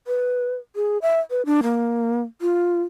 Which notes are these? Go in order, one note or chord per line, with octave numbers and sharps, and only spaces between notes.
B4
G#4
E5
B4
D4
A#3
F4